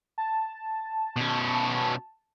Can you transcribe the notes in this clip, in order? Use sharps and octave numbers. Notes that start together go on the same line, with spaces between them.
A5
B2 C#4